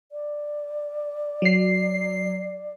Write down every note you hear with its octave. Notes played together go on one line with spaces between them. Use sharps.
D5
F#3 C7